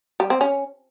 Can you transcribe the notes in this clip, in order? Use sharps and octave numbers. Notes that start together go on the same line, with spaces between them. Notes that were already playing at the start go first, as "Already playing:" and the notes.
G3
C4
C#4